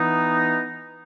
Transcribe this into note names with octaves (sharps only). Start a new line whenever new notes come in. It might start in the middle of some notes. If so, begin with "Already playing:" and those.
Already playing: E3 B3 D#4